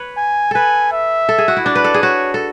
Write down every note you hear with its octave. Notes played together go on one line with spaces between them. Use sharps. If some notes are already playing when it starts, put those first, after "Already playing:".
Already playing: B4 C#5
G#5
A4 B4 G#5
E5
A4
G#4
F#4
E4
D4 D5
B4
A4
G#4
F#4 C#5
A4